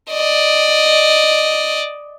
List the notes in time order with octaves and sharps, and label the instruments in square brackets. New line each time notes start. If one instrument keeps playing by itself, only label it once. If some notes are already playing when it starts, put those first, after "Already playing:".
[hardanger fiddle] D5 D#5